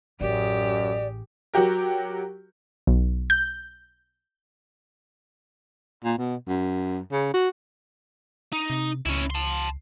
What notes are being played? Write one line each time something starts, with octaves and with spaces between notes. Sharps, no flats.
A1 F#2 G4 G#4 D5
F#3 F#4 G4 A#4
B1
G6
A#2
B2
F#2
C#3
F#4
D#4
C3
C#2 C#4 E4
A5 C6